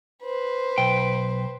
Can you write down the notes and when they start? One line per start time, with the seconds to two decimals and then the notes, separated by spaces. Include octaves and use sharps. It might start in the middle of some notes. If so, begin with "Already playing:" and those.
0.23 B4 C5
0.78 B1 G5